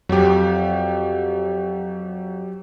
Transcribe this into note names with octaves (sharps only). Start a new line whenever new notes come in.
F2 F#3 G4